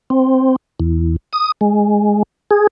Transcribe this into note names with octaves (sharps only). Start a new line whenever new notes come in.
C4
E2
D#6
G#3
G#4